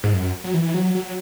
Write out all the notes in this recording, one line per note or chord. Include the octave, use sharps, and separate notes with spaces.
G#2
F#2
F#3
E3
F#3
F#3